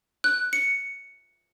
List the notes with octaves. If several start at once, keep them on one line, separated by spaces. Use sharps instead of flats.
F#6
C#7